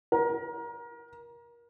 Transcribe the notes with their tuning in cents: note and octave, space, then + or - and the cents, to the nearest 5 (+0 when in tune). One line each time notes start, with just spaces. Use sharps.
A#4 +25